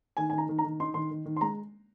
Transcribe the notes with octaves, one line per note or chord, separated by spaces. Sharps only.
D#3 G#5
D#3 G#5
A#5
D#3
A#5
D#3
D#4 C6
D#3 C6
D#3
D#3
C6
G#3 A#5